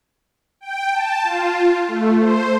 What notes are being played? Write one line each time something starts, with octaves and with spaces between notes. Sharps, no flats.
G5
A5
F4
A3
C5